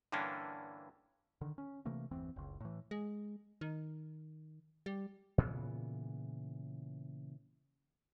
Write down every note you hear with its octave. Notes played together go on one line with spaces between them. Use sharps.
G2 D3 E3 A#3 C#4 D4
D3 D#3
C#4
C3 E3 A3 A#3
G1 E2 E3 C4
F#1 C#2
A2 E3
G#3
D#3
G3
A#2 C#3 E3 B3